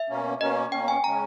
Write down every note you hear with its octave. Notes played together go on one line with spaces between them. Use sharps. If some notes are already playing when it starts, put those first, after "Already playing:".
Already playing: E5
B2 A#3 C#4
B2 A#3 C#4 D#5
B2 A#3 C#4 G5
G#5
C#3 G#3 C#4 A#5